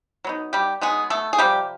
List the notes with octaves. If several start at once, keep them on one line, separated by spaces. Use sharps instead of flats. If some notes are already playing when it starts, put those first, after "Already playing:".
F#3 B3 D#4
G3 G4
F#3 G#3 B3 D#4 G#4
A3 A4
G#4
C3 F3 G3 G4